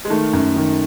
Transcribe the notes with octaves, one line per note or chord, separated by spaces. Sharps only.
G#3
D#3 A3
F#2
D#3